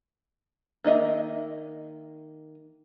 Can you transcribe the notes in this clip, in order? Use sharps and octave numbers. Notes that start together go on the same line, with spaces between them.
D#3 A#3 D#5 E5